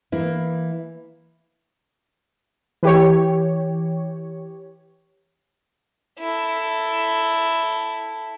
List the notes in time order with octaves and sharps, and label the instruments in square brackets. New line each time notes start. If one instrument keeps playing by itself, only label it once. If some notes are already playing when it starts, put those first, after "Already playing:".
[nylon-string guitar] E3 A#3 E4
[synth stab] E3 G4 C#5
[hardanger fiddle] E4 A4